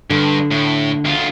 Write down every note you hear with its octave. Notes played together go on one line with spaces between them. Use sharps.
G2 D3
A2
D2 F4